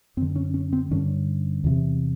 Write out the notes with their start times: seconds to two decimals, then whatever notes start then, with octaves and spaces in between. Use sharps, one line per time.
0.17 F#2 C4
0.21 D3
0.36 C#4
0.54 C#4
0.73 C4
0.91 G2 D3 C#4
1.64 E2 C3